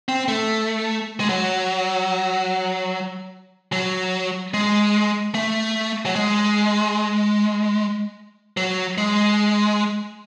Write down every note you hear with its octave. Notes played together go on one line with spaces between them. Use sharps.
C4
A3
G#3
F#3
F#3
G#3
A3
F#3
G#3
F#3
G#3